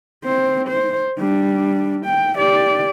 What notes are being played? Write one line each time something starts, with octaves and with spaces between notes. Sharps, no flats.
C4 C5
C5
G3 D4
G5
G4 D5